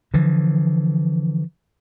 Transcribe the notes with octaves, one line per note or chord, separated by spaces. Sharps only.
D3 E3 F3